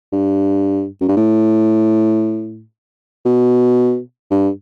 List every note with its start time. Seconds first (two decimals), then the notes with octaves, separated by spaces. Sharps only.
0.12 G2
1.01 F#2
1.08 G2
1.17 A2
3.25 B2
4.31 G2